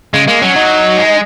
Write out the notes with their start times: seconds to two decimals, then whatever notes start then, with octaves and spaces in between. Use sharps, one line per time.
0.14 C#3 G#3
0.27 G#3 A#3
0.42 F#3 C#4
0.56 D#4
0.98 G#3